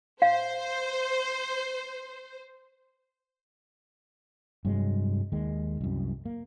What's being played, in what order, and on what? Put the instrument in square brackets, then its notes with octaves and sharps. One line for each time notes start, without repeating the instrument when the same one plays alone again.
[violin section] C5 [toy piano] F5
[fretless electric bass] G2 C3 F#3 G#3
D#2 D#3 G#3
C2 F#2
A#3